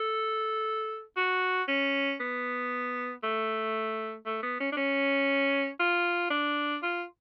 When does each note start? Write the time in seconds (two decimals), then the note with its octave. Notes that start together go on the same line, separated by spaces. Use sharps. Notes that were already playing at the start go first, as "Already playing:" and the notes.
Already playing: A4
1.17 F#4
1.68 C#4
2.20 B3
3.23 A3
4.26 A3
4.43 B3
4.60 C#4
4.72 D4
4.77 C#4
5.80 F4
6.30 D4
6.83 F4